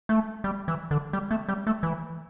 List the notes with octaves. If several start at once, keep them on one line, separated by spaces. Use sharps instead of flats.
A3
G3
E3
D3
G3
A3
G3
A3
E3